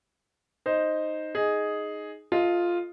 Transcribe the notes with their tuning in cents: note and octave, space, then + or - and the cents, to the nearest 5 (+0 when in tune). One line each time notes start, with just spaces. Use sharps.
D#4 +0 C5 +0
D#4 +0 G#4 +5
F4 +0 A4 +0 D#5 +20